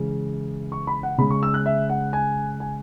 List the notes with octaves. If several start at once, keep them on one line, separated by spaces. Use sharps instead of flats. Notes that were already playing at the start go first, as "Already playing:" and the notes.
Already playing: C#3 E3 G#3
C#6
B5
F#5
C#3 G#3 B5
C#6
E6
F#6
E5
F#5
G#5
G#5